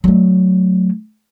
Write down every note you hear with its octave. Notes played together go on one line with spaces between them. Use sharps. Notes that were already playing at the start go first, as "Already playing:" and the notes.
F#3 A3